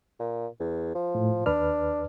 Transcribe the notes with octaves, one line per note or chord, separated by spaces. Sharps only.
A#2
E2
F3
A2
D#2 D4 B4 F6